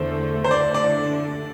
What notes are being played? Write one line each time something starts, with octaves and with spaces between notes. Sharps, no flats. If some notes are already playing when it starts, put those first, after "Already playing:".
Already playing: E2 D3 A3 C5
C5
D2 D3 A3 D4 D5
D5